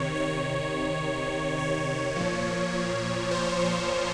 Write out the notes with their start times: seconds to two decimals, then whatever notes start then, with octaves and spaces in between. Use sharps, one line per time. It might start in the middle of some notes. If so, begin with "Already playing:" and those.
Already playing: C3 D#3 C#5
0.16 C#5
1.59 C#5
2.16 A#2 F3
3.31 C5
3.59 C#5